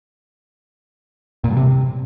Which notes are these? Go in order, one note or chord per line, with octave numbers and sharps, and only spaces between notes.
A#2
G2
C3